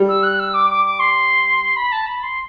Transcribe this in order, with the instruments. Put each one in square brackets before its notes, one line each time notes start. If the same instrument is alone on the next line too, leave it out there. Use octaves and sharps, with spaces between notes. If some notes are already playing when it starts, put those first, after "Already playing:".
Already playing: [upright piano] G3
[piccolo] E6
F#6
E6
D6
D6
D6
C6
B5
A5
B5
C6